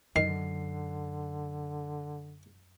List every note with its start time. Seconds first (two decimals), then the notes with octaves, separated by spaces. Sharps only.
0.16 F#2 D3 D#3 C7